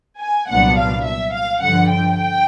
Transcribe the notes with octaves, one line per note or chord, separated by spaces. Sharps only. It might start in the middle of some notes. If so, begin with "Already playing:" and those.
G#5
C2 A#2 F#3 B3 D4 F#5
F5
E5
F5
G2 D3 F3 F#5
G5
G5